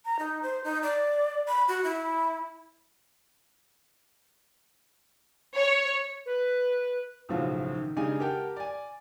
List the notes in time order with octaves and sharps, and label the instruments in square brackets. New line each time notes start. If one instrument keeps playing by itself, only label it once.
[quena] A#5
D#4
C5
D#4
D5
B5
F#4
E4
[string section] C#5
[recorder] B4
[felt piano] B1 A2 C#3 F3 F4 F#4
D#3
C#3 G#3 D4 D#4 G4 G#5
G4 A#4 F#5 G5 A5
D5 G#5